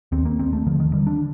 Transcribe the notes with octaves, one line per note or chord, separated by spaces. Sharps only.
D#2 C4
A#3
D#2 C4
A3
D3 F3
D#3
D3 G3
D4